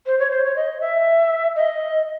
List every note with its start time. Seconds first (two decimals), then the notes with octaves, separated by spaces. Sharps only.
0.06 C5
0.19 C#5
0.31 C5
0.44 C#5
0.56 D#5
0.81 E5
1.56 D#5